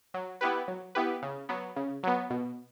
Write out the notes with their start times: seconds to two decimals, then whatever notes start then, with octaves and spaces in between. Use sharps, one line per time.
0.14 F#3
0.41 B3 E4 G4 B4
0.68 F#3
0.95 B3 E4 G4 B4
1.23 C#3
1.49 F#3 B3
1.76 C#3
2.03 F#3 B3
2.30 B2